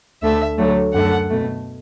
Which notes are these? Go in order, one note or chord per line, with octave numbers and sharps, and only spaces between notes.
D2 D3 A3 E5
D2 D3 F#3 A3
F#2 D3 A3 F#5
B2 A3